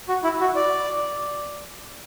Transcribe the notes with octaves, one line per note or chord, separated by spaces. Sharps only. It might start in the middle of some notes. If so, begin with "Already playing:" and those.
F#4
E4
F#4
D5